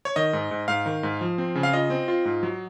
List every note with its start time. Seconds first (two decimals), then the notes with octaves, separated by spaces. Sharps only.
0.05 C#5
0.16 D#3 D#5
0.33 G#2
0.51 G#2
0.68 G#2 F5
0.86 D#3
1.03 G#2
1.21 F3
1.38 C4
1.55 C#3
1.63 F5
1.73 F4 D#5
1.90 C4
2.08 F4
2.25 G#2
2.43 F#3